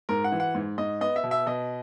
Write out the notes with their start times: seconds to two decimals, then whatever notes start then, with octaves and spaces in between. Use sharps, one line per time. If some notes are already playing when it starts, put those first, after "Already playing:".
0.09 G#2 A#4
0.24 F#5
0.32 E3
0.40 F#5
0.55 G#2
0.78 G#2 D#5
1.01 B3 D#5
1.16 E5
1.24 B2
1.31 E5
1.46 B2 D#5